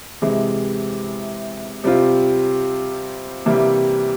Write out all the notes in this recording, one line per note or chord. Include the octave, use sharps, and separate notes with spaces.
C3 E3 G#3
C3 G3 C4 F4
C3 E3 G3 A#3